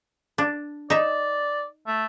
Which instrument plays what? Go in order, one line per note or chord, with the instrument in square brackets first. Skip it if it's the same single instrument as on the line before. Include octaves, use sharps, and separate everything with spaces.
[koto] D4
[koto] D#4 E5 [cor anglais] D5
[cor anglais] A3